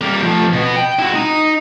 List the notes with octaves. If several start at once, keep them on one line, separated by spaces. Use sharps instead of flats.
G3 A#3
F3 A3
B2 B3
G5
E4 F#4
D#4